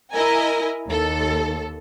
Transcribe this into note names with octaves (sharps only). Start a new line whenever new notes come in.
E4 A#4 D#5 G#5 A#5
D#2 A4